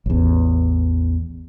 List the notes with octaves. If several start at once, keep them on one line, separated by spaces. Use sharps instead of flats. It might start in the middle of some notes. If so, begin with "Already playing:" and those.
A1 E2